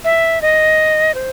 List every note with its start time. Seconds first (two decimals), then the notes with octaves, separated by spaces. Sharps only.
0.04 E5
0.42 D#5
1.14 C5